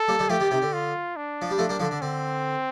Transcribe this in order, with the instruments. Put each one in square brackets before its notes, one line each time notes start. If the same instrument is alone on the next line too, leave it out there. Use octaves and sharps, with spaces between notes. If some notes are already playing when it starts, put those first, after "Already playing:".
Already playing: [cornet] A4
[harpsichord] G3 A#3
D#3 G3
[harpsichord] F3 A3 [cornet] G4
[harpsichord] D#3 G3
C3 D#3
D3
[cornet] F4
D4
[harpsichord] F3
G3
F3 A3
G3 A#3
D3 F3
D3
[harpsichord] D3 [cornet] C4